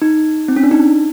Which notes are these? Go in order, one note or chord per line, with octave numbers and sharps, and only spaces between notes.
D#4
C4
C#4
D4
D#4